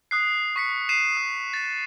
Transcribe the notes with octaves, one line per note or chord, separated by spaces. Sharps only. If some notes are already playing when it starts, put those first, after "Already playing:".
D#6 F#6 C7
C#6 B6 C#7
C7 D#7 E7
D#6
A6 B6